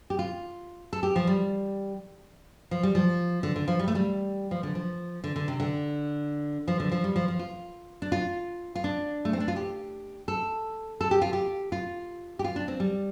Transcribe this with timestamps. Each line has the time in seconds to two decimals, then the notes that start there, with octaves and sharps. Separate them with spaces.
0.10 G4
0.19 F4
0.93 A4
1.03 G4
1.16 F3
1.27 G3
2.71 F3
2.83 G3
2.95 F3
3.43 D3
3.56 D3
3.68 F3
3.79 G3
3.88 A3
3.95 G3
4.51 F3
4.63 D3
4.75 F3
5.24 D3
5.36 D3
5.48 C3
5.60 D3
6.68 F3
6.80 D3
6.92 F3
7.04 G3
7.16 F3
7.28 F3
7.39 F4
8.02 D4
8.12 F4
8.75 F4
8.84 D4
9.25 A3
9.33 C4
9.40 D4
9.48 F4
9.56 G4
10.28 A4
11.01 A4
11.11 G4
11.22 F4
11.33 G4
11.72 F4
12.39 G4
12.44 F4
12.56 D4
12.68 C4
12.80 G3